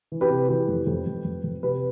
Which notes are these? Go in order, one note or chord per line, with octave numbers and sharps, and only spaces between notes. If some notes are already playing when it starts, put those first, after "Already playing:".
E3
G4 B4
C3
E3 G4 B4
F2
F2
F2
F2
F2
C3 G4 B4